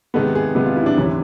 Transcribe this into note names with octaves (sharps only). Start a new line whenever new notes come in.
C3 D#3 G#3 B3 A4
G#4
C3 D#3 G#3 B3
F4
E4
D4
D2 C3 E3 C#4